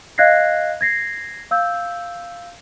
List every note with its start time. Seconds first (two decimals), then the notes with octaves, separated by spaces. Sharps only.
0.18 D#5 F5 F#6 G#6 A#6 C7
0.81 G#6 A#6 C7
1.51 F5 E6 G6